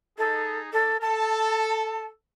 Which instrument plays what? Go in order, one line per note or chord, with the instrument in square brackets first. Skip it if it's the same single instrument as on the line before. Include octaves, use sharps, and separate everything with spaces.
[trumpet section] D#4 G#4 [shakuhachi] A4
[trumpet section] D4 [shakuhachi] A4
[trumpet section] A4 [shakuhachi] A5